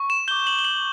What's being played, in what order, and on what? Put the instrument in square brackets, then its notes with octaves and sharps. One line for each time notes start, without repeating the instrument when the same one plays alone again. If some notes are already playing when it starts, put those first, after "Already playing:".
Already playing: [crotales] C#6
E7
D6 G6 G7
F#7
G7
F#7